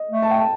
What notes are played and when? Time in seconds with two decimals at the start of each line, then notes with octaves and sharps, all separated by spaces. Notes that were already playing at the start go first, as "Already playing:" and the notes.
Already playing: D#5
0.11 A3
0.22 A5
0.31 G5
0.38 A5